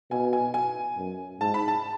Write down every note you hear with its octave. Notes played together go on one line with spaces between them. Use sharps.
B2 G#5
G#5
G#5
F#2
G#2 A5
B5
A5